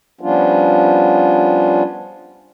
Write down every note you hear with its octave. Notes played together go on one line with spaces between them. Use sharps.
F3 G3 B3 C#4 D4 F4